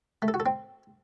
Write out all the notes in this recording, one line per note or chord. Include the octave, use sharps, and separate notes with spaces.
A3
A4
F#4
A4
C4